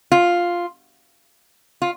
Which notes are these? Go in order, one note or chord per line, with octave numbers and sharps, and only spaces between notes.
F4
F4